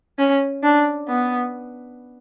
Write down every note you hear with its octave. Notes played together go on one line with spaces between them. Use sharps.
C#4
D4
B3